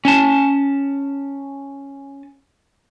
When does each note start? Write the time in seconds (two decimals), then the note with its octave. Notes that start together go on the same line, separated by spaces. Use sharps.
0.05 C#4 A5